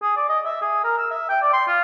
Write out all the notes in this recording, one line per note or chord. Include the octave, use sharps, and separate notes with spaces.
G#4
D5
D#5
E5
G#4
A#4
E6
E5
G5
D5
C6
F4